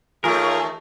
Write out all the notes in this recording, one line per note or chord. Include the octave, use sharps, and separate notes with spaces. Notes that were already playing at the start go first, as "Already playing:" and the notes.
D#2 A3 F4 G#4 A#4